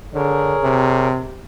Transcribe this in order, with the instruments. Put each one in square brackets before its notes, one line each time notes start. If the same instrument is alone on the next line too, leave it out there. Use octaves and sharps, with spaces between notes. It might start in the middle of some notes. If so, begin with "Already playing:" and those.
[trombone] D3 [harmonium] G#4 A#4 C#5
[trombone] C3